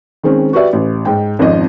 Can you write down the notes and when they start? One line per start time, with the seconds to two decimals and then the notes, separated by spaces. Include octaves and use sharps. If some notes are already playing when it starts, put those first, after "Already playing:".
0.23 D#3 G#3 C4 C#4
0.53 F#4 G4 B4 D5 E5
0.73 A1
1.05 G#2 G5
1.39 G#1 F2 F3 C#4 D#5